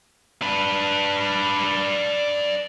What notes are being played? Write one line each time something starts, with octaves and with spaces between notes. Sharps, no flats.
D4 B4